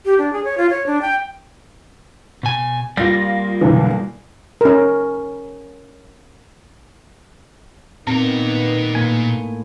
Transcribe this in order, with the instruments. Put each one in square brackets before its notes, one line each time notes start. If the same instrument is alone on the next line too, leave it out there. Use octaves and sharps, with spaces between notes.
[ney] G4
D4
G#4
C#5
F4
C#5
D4
G5
[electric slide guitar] B2 G#5
[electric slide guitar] G3 A#3 D5 [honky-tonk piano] F4 A#6
[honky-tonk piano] B1 D3 E3
[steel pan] C#4 A#4
[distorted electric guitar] A#2 A#4 [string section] D#3 B3 [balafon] C4
[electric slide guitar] A2 A#3 G#5